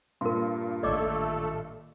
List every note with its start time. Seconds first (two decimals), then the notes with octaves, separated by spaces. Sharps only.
0.21 G2 A#2 A#4 C6
0.83 A1 D#3 A3 A4 D5 D#5 D6